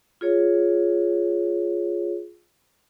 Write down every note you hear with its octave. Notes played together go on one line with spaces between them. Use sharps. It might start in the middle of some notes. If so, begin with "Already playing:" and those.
F4 G#4 C#5